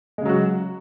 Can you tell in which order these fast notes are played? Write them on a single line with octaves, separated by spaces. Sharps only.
G#3 C#3 F#3 F#4